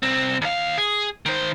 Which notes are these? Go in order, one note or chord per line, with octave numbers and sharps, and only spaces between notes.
C2 C4
D#2 F5
G#4
D#3 C5